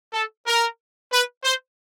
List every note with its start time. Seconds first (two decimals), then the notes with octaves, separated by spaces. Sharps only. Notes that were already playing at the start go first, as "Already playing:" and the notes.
0.14 A4
0.47 A#4
1.12 B4
1.44 C5